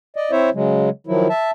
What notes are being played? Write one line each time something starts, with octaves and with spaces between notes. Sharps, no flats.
D5 D#5
C4 E4 C5 C#5 E5
C#3 F#3 G#3
D#3 F3 F#3 E4
E5 A5